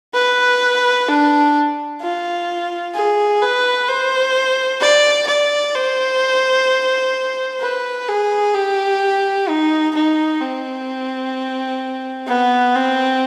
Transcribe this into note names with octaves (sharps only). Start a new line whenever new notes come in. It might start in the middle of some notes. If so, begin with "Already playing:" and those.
B4
D4
F4
G#4
B4
C5
D5
D5
C5
B4
G#4
G4
D#4
D#4
C4
B3
C4